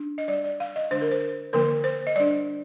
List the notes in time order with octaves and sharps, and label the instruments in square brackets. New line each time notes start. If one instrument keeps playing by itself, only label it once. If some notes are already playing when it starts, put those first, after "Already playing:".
Already playing: [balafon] D4
D#5
G3 D4 D5
D5
F5
D#5
D3 G#3 D4 C5
A#4
C5
D3 F3 A#3 A#4
C5
D#5
G3 D4 D5